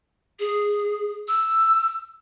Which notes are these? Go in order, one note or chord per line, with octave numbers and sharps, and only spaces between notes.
G#4
E6